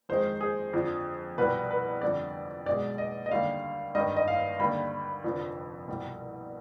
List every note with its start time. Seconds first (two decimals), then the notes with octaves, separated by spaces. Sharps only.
0.09 F2 D#3 G#3 C5
0.41 G#4
0.73 F2 D3 F3
1.38 C2 B2 G3 B4
1.71 B4
2.02 F2 D3 G3 D5
2.66 B1 B2 G#3 D5
2.98 D#5
3.26 D#5
3.31 D#2 D3 G3 F5
3.95 G#1 G2 D#3 G3 D#5
4.16 D#5
4.28 F5
4.59 D#2 D3 G3 B5
5.24 F1 F2 D3 F3
5.88 C2 B2 G3